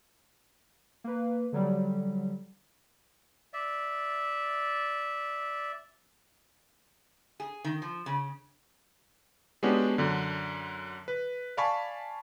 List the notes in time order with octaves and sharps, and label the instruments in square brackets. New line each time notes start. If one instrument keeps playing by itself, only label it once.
[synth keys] A#3 B4
D3 F#3 G3
[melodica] D5 E5
[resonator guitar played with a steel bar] G#4
D#3
F3
C#3
[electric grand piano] G#3 B3 C#4 D4 F#4 G4
F#2 D3
B4
D5 F5 G#5 A5 B5 C#6